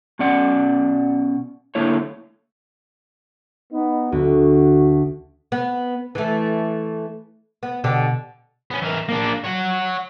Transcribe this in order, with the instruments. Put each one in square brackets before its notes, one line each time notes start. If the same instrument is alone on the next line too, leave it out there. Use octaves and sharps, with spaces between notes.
[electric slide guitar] B2 C#4 D5 F#5
D3 A3 A#3 E4 C#5
[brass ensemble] B3 D#4
[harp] D2 [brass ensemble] F#4
[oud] B3
E3 A3
B3
B2 D3 G4
[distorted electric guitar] B3 C#4
E3 A#4
A#3 D4
C#5 F#5